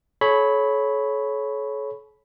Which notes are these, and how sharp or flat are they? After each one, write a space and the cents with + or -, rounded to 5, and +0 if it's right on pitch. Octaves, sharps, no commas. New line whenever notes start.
A4 -45 C#5 +0 B5 +0